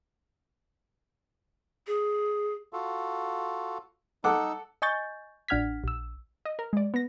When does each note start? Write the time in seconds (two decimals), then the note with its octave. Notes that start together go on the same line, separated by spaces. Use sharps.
1.87 G#4
2.73 F4 F#4 A4
4.24 D#4 A4 F#5 D6 E6
4.82 D#5 G#5 C#6 G6 A6
5.48 A1 D4 F#5 F6 G#6 B6
5.84 A#1 E6
6.45 D#5
6.59 A#4
6.73 G#3 D5
6.94 B3 A#6